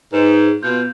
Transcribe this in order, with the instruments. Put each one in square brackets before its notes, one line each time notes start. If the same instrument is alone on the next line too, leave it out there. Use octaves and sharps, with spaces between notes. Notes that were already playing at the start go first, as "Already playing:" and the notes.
[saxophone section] G#2 [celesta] B4 C5 E7
[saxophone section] B2 F4 [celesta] G6